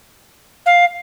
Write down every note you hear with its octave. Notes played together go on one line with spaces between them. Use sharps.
F5